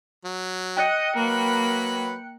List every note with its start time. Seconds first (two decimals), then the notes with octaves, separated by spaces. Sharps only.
0.25 F#3
0.77 D#5 G5 F#6 C#7
1.17 F#3 A#3 B4 B5